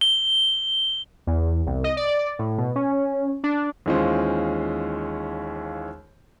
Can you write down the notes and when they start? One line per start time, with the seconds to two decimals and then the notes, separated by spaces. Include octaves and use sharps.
0.01 G7
1.27 E2
1.66 C2
1.84 D#5
1.97 D5
2.39 A2
2.58 B2
2.75 C#4
3.44 D4
3.86 D#2 E3 G#3 C#4 F4 C5